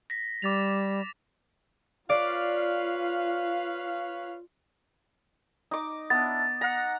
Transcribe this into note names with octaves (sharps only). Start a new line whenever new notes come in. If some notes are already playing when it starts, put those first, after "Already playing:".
A#6 B6
G3 D6 A6 F7
F4 B4 C#5 D5 F5
D#4 D6
B3 D4 E4 A6
F#5 A#5